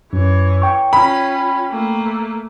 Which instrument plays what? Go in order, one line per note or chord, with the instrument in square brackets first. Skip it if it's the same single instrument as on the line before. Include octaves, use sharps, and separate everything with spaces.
[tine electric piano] F#2 [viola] E3 C#5
[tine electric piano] G5 C#6
[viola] C#4 F4 [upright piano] B5
[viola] A3 A#3